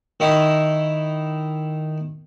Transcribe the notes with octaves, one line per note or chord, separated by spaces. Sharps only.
D#3 D#4 E4 C#6